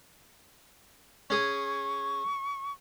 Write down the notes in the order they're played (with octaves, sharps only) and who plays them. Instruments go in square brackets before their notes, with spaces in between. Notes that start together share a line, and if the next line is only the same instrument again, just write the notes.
[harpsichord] C#4 G#4 D#6 [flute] C#6